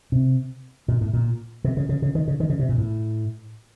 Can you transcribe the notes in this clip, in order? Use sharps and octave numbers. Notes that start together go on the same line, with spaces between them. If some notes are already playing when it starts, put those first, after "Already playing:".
C3
A#2
A2
A#2
C3
C#3
C#3
C#3
D#3
C#3
D#3
C#3
C3
A#2
A2